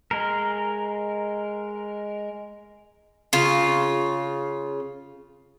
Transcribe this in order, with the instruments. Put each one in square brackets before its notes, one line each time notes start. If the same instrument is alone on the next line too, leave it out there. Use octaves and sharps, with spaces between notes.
[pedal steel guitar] G#3 A#4
[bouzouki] C#3 F4